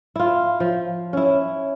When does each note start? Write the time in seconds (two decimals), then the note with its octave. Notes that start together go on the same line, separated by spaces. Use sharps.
0.16 E4 F4
0.60 F3
1.13 C#4 E4